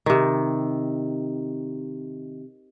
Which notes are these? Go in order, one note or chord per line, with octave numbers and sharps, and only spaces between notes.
C3 D#3